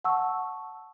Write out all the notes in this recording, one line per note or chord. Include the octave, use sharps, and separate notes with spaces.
F#5 A5 C#6 E6